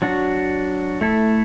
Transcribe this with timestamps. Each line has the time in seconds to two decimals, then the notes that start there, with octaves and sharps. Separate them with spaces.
0.02 F#3 D4 F#4
1.01 A3 E4 A4